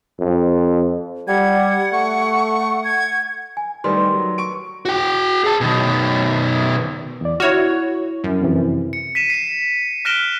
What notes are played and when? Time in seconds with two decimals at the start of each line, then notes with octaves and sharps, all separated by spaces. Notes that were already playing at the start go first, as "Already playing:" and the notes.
0.20 F2
1.28 G3 F#5 G#6
1.93 A3 C#6
2.84 G#6
3.57 G#5
3.84 D#3 G3 A3 B4 C6
4.14 F#3
4.38 C#6 D7
4.85 F#4 G5
5.44 G#4 A5
5.61 B2 D#3
7.21 E2 D5
7.40 E4 F#4 C#5 F6
8.24 F#2
8.41 F2 C3 E3
8.93 C#7
9.15 B6 D#7 E7
9.30 C7 E7
10.05 F6 F#6 A#6 D7 E7 G7